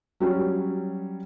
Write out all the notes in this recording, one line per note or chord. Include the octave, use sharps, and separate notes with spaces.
F#3 G3 C#4